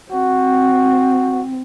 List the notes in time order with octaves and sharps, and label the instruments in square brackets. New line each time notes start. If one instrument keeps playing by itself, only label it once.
[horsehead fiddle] C4 [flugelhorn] F#4